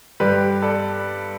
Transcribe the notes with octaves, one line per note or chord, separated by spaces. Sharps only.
G2 D3 G3 G4 B4
A4 D5